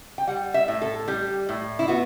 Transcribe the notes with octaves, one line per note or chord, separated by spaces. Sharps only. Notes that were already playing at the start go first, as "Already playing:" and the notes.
G5
G3 F#5
E5
A2
A4
G3 G4
A2
E4
B3 F#4